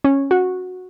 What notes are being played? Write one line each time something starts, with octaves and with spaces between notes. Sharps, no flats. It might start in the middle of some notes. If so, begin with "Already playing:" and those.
C#4
F#4